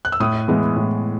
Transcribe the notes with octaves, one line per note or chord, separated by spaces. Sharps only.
F#6
E6
A2 D#6
E3 G#3 B3
A2